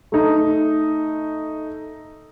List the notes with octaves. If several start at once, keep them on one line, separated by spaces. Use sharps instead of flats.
A3 D#4